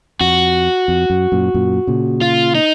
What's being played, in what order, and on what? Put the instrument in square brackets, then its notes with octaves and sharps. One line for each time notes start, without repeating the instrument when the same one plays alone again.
[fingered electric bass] F2 [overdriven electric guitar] F#4
[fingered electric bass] F2
F#2
F#2 A#2
F#2 A#2
A#2 C#3
[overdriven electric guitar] F4
D#4